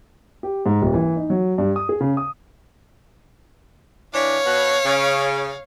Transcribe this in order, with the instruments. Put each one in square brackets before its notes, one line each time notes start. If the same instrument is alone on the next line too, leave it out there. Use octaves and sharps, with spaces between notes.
[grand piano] G4
G#2
D#1
E3
D#4
F#3
G2
D#6
G#4
C#3
D#6
[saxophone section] E3 D4 [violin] C#5 F5
[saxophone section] B2 B3 F#4
C#3